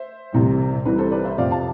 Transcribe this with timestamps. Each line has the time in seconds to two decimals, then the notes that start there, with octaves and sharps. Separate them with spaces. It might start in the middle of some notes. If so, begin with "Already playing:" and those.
Already playing: C5 E5
0.32 C2 C3 E3 G3
0.85 C2 C3 E3 G3 B4
0.98 A4 C5
1.11 B4 D5
1.25 C5 E5
1.38 F2 C3 F3 D5 F5
1.51 F5 A5